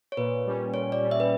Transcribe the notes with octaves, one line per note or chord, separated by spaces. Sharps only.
C#5
A#2 B4
G3 C#4
A#2 C#5
D5
G3 C#4
E5
B4